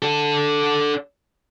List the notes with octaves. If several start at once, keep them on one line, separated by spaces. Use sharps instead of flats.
D4 A4